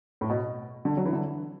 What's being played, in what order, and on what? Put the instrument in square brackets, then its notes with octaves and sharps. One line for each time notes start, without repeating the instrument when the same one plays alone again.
[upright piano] A2
B2
D3
F#3
E3
D3